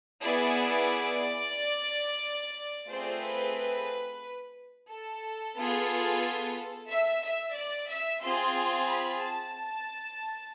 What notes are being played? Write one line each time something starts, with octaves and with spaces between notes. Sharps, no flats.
B3 E4 G#4 D5
A3 C4 F4 G#4 C5
B4
A4
B3 F4 G#4
E5
E5
D5
E5
C4 F4 G#4 C6
B5
A5